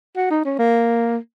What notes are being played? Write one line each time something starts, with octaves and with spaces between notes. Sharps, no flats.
F#4
D#4
C#4
A#3